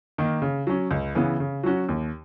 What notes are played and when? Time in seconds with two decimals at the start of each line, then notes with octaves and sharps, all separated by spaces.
0.18 D#3 A#3
0.42 C#3
0.67 F#3 C#4
0.91 C#2
1.15 C#3 E3 B3
1.40 C#3
1.63 F#3 C#4 F#4
1.89 D#2